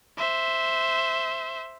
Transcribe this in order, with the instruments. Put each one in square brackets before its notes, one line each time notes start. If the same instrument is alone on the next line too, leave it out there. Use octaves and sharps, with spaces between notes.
[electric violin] C5 E5